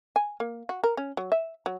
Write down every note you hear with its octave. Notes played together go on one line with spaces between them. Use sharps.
G#5
A#3
F#4
A#4
C#4
F#3
E5
F#3